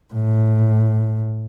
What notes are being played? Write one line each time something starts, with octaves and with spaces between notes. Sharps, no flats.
A2